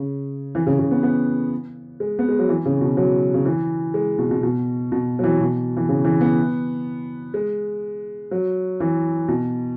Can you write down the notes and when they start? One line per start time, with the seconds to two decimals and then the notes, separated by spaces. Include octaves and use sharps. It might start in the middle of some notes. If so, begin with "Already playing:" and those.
Already playing: C#3
0.55 E3
0.66 C#3
0.79 C#3
0.91 B3
1.03 B3
2.00 G#3
2.19 B3
2.29 G#3
2.39 F#3
2.49 E3
2.65 C#3
2.81 B2
2.97 F#3
3.34 C#3
3.45 E3
3.94 G#3
4.18 B2
4.31 B2
4.43 B2
4.92 B2
5.19 F#3
5.24 E3
5.40 B2
5.77 E3
5.89 C#3
6.05 E3
6.21 B3
7.34 G#3
8.31 F#3
8.80 E3
9.28 B2